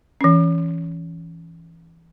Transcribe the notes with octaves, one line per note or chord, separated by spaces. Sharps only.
E3 C#4